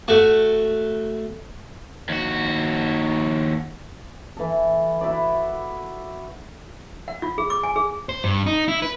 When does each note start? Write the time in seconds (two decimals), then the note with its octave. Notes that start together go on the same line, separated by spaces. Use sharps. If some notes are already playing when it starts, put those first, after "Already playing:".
0.08 A3 F#4
2.09 D#2 F#4
4.37 E3 A4
5.01 E4 F#4 D5
7.08 F#5
7.22 F4
7.38 G#4
7.50 D6
7.63 G#5
7.76 G#4
8.09 C5
8.24 G2
8.46 D#4
8.68 E4
8.82 B4